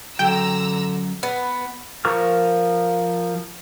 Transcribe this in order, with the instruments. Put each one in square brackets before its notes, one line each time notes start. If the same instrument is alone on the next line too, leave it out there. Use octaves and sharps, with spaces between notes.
[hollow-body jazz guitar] F#2 [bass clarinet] D3 [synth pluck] G5 [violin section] A#5 E6
[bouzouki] B3
[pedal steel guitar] F3 A#4 C#6 F6